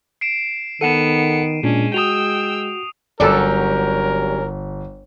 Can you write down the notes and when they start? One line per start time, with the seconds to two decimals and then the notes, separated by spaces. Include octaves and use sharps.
0.21 C7 D7 E7
0.81 D#3 B3 A4 F#5 A5 C#7 D#7 E7
1.63 A#2 G#3 C#4 D4
1.94 F#4 G5 D#6 E6 F7
3.20 G1 F#3 G3 C#4 A4 A#4 D5